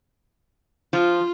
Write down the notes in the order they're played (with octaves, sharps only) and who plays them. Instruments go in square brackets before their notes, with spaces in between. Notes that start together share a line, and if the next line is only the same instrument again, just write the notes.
[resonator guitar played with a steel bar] F3 [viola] F4